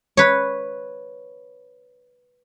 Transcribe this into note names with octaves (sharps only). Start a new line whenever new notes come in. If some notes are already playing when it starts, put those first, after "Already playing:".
B4 C#5